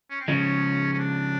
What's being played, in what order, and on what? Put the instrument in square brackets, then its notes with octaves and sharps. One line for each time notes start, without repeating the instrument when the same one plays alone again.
[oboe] C#4
C4
[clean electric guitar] C#3 F3 G#3 [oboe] C#4
[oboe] C#4
D4